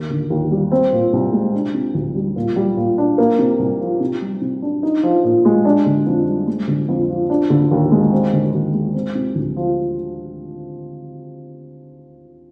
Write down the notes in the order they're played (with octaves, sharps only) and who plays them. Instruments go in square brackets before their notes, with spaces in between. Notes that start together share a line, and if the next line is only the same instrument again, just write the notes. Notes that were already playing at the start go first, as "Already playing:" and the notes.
Already playing: [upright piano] D#2 A#3
D3
D#2
G3
C4
A#2
C2
G#3
D4
C3
D2
G3
A#2
G3
A#2
D4
A#3
C3
C2
F3
C3
G3
C3
D4
D#4
F3
A#2
G#3
D4
D3
F2
G3
G#3
D3
F2
F3
D4
D3
D#2
G#3
C4
D3
D#2
G#3
C4
C3
D2
F3